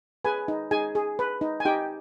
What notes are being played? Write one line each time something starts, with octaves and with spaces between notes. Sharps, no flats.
G#4 B4 G#5
D#4
D#4 G#4 G#5
G#4
B4
D#4
G#5
D#4 G4 G5